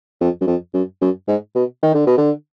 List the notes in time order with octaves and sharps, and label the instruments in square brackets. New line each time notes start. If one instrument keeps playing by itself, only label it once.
[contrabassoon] F2
F#2
F2
F#2
F#2
G#2
B2
D#3
D3
B2
D3